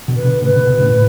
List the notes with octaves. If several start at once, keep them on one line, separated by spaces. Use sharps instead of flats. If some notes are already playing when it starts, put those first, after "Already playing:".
B2 D3
B4
B2 D3
A2 C#3 B4
B2 D3
B2 D3
A2 C#3
A2